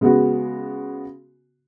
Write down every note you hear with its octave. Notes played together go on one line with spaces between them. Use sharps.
C#3 G#3 B3 F#4